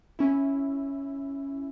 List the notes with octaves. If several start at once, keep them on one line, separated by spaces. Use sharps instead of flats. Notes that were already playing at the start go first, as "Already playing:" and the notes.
C#4 E4